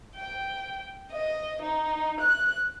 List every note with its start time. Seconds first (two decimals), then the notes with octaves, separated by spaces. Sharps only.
0.16 G5
1.12 D#5
1.62 D#4
2.20 F#6